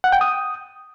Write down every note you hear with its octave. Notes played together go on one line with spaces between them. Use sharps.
F#5
G5
D#6